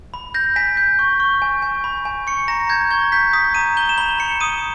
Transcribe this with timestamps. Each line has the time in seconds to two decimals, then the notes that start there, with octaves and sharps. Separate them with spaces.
0.14 B5
0.34 G6 A#6
0.56 G#5 B6
0.77 G6
0.99 C#6
1.20 C#6
1.42 G#5
1.62 G#5
1.84 B5
2.05 G#5
2.27 C#6 C#7
2.48 A#5 A#6
2.69 G6 G#6
2.91 C#6 G#6
3.12 G6 B6
3.33 D#6 B6
3.55 A#5 D#7
3.77 G6 G7
3.89 E7
3.98 B5 G7
4.19 B5 C#7
4.40 D#6 D#7